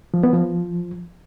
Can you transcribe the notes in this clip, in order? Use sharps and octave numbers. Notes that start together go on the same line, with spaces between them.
F3
B3
F3